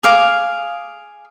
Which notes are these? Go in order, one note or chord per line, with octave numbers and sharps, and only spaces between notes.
G#4 F5 D6